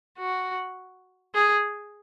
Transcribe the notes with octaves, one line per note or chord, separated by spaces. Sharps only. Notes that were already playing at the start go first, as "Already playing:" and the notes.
F#4
G#4